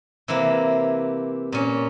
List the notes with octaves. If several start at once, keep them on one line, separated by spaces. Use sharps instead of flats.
C3 E3 A#3 E4
A#2 C#4